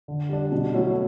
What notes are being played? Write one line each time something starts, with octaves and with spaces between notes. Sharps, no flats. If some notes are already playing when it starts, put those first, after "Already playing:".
D3
G3 D4
B2
F#3 A3 C#4 E4